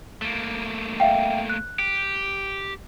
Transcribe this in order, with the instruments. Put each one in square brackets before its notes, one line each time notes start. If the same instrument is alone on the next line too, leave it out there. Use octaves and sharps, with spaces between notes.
[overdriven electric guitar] A3 A#3
[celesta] E5 F5 G5
F#6
[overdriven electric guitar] G4